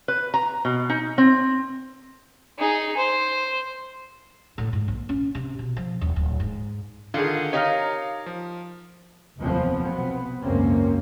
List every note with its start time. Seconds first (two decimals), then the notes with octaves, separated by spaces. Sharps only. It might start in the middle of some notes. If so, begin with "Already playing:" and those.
0.08 B4
0.34 A#5
0.65 B2
0.89 D#4
1.18 C4
2.58 D#4 G#4
2.97 C5
4.58 A2
4.73 G#2
4.88 A#1
5.09 C#4
5.35 C3
5.59 B2
5.77 F3
6.01 D#1
6.16 D1
6.40 G#2
7.14 D3 D#3 F4 G#4
7.53 D#4 G4 A#4 C#5 F5 F6
8.26 F3
9.38 F1 D#2 A#2 F3 B3 C4
9.80 B1 B3 C4
10.41 G#1 C#2 F#2 A#3 C4 C#4